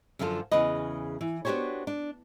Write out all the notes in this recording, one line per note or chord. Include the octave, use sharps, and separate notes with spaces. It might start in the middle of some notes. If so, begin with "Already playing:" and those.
F#2 D3 F3 E4 F4 A4
E2 C#3 B4 D#5
E3
B3 D4 F#4 G4 C5 C#5
D4